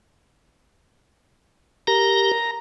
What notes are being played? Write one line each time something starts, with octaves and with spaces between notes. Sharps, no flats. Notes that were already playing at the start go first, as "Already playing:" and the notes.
G4 A#4 A#5